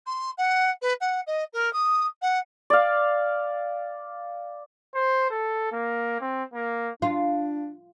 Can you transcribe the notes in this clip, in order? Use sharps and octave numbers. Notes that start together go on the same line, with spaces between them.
C6
F#5
B4
F#5
D#5
A#4
D#6
F#5
D5 F5
C5
A4
A#3
C4
A#3
D4 F4